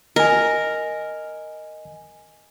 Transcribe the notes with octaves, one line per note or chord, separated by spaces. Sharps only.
A#4 D#5 G#5